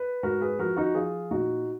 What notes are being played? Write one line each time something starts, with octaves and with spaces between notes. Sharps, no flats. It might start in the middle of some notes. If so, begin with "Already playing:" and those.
Already playing: B4
G#2 F#4 A#4
G#4 B4
F3 F#4 A#4
D#4 F#4
F3 F4 G#4
A#2 D#4 F#4